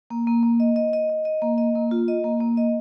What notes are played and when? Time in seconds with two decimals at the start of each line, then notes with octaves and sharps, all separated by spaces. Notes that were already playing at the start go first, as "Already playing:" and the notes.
0.10 A#3
0.27 A#3
0.43 A#3
0.60 D#5
0.76 D#5
0.93 D#5
1.09 D#5
1.25 D#5
1.42 A#3
1.58 D#5
1.75 A#3
1.91 F4
2.08 D#5
2.24 A#3
2.40 A#3
2.57 D#5